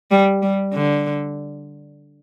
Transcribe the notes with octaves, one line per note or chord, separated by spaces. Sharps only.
G3
G3
D3